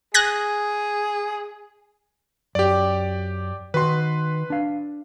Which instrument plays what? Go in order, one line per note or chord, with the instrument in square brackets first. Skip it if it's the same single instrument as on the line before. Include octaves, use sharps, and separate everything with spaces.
[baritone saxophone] G#4 [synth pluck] F#6 G#6 A#6
[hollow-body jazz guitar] F#2 [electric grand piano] G4 D5
[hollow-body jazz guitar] D#3 F#4 [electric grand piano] B4 C6
[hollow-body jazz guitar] D4 F5